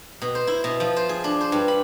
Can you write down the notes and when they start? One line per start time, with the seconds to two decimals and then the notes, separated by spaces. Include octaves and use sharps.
0.22 B2
0.35 C5
0.47 E4
0.64 B2
0.80 F3
0.96 C5
1.09 G#4
1.24 D4
1.41 C5
1.52 G2
1.68 B5